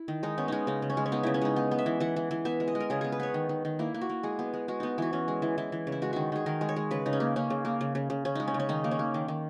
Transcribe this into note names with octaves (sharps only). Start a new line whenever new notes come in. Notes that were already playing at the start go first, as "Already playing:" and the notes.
Already playing: E4
D#3
G#3 D#4
B3 C#4
G#3 C#4 D#4
C#3 D#4
C#3
C#4
G#3
C#4
B3 D#4
C#3 E4
C#4
G#3 D#4
B3
B3
E5
E3
E3 F#5
E3
E3
B3 E5
G#3
D#5
G#3
A#4
C#3 G#4
B3 G#4
B4
B3 C#5
D#3
D#3
D#3
A#3 E4
A#3
F#4
A#3
G#3 G#4
B3
G#3
G#3 F#4
B3 D#4
E3 F#4
E3 C#4
G#3
E3
E3 E4
E3
C#3
E4
G#3 F#4
D#3 F#4
D#3 G#4
D#3 A#4
G#3
C#5
G#3
C#3 B4
C#3 D#4
C#4
A#3
A#3 C#4
C#3
A#3
C#3
C#3
C#3
C#3 C#4
G#3 D#4
C#4
C#3
C#4
D#3 D#4
A#3
C#4
A#3
D#3
D#3